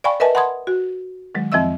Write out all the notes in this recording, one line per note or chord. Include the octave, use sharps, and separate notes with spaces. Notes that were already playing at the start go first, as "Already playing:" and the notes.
D5 F5 G5 G#5 B5 C#6
A#4 B4 D#5 E5 G#5 A5
F#5 A5 B5 C6 D#6 G#6
F#4
D#3 F#3 G#3
F2 F3 C4 D#5 E5 E6